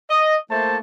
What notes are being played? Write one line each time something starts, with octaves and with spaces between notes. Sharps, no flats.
D#5
A3 A#3 E4 C5 A5